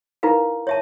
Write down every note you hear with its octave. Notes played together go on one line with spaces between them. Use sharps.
D#4 E4 A#4 B4 F5
C#5 E5 A5